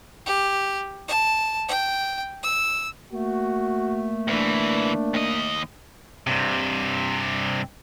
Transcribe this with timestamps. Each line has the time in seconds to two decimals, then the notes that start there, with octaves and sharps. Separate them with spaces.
0.26 G4
1.08 A5
1.69 G5
2.43 E6
3.13 A3 A#3 F#4
4.28 D2 E3 D4
5.14 D#2 D#5
6.27 G2 C3